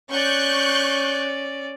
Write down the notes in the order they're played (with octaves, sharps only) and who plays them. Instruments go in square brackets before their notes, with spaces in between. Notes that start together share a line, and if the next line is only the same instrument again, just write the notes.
[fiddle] C#4 D5 [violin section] C#6 F#6 G6